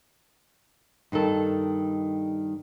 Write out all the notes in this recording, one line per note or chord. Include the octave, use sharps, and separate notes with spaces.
G2 D#3 G3 A4